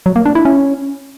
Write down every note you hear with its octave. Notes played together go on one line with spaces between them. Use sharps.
F#3
A#3
D4
E4
C#4